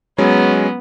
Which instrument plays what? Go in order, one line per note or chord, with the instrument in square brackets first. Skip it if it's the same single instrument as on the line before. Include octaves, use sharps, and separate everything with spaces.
[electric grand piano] F#3 G#3 C#4 [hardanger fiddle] B3